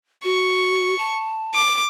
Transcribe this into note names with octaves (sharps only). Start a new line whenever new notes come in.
F#4 C#6
A5
D6